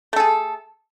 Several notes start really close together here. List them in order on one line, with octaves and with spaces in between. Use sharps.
A3 A4 G#4